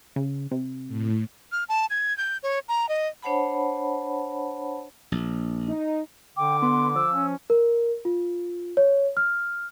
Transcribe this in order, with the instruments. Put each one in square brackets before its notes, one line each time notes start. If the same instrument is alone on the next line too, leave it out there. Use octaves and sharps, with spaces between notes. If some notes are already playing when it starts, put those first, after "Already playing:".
[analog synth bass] C#3
C3
[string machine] A2
[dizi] F6
A5
G#6
G6
C#5
A#5
D#5
[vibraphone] D4 C5 C#5 F#5 A5 B5
[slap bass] A#1
[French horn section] D#4
[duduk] D3 [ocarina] G5 [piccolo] D6
[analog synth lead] B3 [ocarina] C6
[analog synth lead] F3 [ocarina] E6
[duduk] C#4
[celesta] A#4
F4
C#5
F6